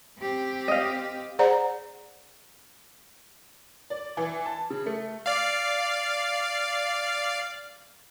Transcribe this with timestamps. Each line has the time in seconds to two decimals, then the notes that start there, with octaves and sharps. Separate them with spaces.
0.18 C4 G4
0.68 D#5 F5
1.39 G#4 C5 D5 F#5 A#5
3.90 D5
4.17 E3
4.46 A5
4.70 C#3
4.86 A3
5.26 D5 F5